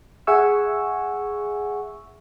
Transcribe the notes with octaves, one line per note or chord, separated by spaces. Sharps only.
G#4 E5 F#5 G#5 C#6 E6